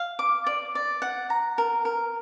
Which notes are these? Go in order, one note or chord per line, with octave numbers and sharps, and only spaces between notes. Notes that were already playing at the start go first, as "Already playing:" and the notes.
Already playing: F5
D6
D5
D5
F#5
A#5
A#4
A#4